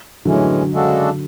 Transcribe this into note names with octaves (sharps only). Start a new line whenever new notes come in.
A2 D3 E3 F#3 G#3 C#4
C#3 G#3 D4 F#4 A4